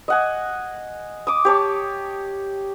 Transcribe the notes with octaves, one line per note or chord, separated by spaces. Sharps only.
D#5 F#5 G#5
D6 D#6
G4 C#5 A5